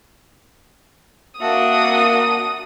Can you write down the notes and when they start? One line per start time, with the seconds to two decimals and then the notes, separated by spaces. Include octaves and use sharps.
1.41 A#3 D4 F#4 E5 A5 D#6